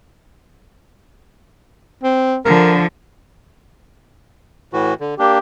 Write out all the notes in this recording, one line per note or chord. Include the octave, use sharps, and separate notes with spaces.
C4
D3 F3 A#4
A2 E3 F#4
D3
A#3 D4 G4